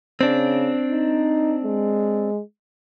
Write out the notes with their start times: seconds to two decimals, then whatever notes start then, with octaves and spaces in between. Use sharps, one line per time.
0.21 C#3 C4 D4
0.91 D#4
1.64 G#3